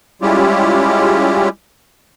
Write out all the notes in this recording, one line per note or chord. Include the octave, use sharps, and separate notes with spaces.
G3 G#3 C#4 E4 F4 G4